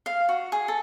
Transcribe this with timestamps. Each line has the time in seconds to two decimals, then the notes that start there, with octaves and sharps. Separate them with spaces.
0.06 F5
0.29 F#4
0.52 G#4
0.68 A4